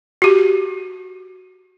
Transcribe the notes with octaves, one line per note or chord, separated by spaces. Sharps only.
F#4 G4